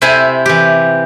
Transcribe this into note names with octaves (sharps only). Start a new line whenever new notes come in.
C3 C4 E4 C5 G#5
E3 G4